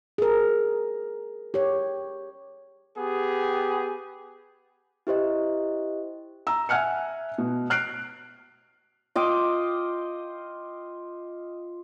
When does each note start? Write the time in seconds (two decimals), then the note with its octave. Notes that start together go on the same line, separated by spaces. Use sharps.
0.18 G#4 A#4
1.54 G4 C#5
2.96 B3 G4 G#4
5.07 E4 G4 C5 D#5
6.47 A#5 E6
6.69 E5 F#5 G#5 F6 F#6 C#7
7.38 B2
7.70 F6 F#6 C7 D7
9.15 F4 D#5 G5 D6